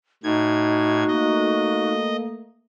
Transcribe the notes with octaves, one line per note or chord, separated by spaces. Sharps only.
A2 D#4 F#4 G#6
A3 A#3 D#5